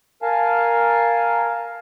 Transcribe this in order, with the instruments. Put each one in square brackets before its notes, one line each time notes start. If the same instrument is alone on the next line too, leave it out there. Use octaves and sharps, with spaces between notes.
[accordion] A#4 F5 G#5 A5